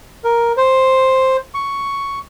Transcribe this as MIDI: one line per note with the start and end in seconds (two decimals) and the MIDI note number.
0.24 0.53 70
0.57 1.37 72
1.54 2.19 85